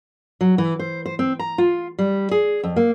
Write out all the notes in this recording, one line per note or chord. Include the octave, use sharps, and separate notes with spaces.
F#3
E3
C5
C5
C4
A#5
F4
G3
G#4
F2
A#3